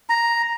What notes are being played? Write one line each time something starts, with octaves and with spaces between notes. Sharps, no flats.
A#5